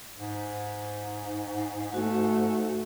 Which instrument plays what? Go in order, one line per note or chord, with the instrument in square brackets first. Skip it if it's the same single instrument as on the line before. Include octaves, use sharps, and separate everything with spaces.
[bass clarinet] G#2
[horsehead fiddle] A3 [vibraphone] F#4